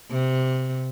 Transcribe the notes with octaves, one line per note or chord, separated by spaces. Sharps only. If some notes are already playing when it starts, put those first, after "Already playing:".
C3